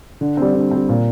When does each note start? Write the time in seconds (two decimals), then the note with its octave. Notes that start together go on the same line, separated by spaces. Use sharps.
0.21 D3
0.37 G3 C4
0.55 D3
0.71 G3 C4
0.89 A#2